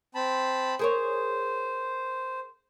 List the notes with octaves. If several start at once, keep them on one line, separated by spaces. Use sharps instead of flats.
C4 A5 B5
G#4 A#4 C5 C#5